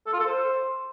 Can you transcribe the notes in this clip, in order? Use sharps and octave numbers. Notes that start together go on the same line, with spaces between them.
A4
F4
A4
C5